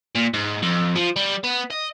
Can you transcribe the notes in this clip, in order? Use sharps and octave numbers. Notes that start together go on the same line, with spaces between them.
A#2
G#2
F2
F3
G3
B3
D#5